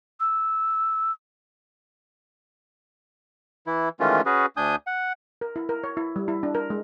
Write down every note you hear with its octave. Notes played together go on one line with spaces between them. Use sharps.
E6
E3 E4
D#3 E3 G#3 A3 C#4 F4
C#4 F#4 G#4 B4
D2 D4 G#5 D#6 G6
F#5
A#4
E4
A#4
C#5
E4
G3
E4
D4
A#4
G#3